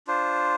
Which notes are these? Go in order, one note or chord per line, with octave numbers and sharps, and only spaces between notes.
D4 F4 C5